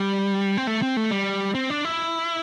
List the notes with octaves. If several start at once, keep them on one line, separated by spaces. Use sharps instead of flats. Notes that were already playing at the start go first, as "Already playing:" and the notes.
Already playing: G3
C4
A3
C4
A3
G3
C4
D4
E4